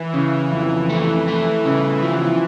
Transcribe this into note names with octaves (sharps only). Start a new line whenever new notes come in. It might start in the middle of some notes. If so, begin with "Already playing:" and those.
Already playing: E3
C#3
F2
E3 A3
A3
C#3
F3